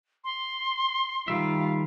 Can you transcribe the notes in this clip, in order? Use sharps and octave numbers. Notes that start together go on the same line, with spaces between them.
C6
D#3 G3 F4 E5